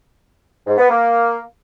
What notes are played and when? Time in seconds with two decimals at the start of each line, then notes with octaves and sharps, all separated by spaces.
0.67 G#2
0.78 B3
0.89 A#3